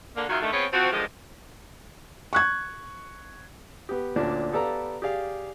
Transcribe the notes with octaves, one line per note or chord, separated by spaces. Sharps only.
D3 A#3
F#2 D#3 G#3 F4 F#4 E5
D3 D#3 A3
B3 C4 F4 G#4 C#5
F3 C4 F#4
G2 D3 D#3 F3 G#3 D#5
C#6 F#6 G#6
B3 G4
D2 A#2 C#4 D4
B3 G4 A4 D5 F5 A#5
G4 G#4 D5 F5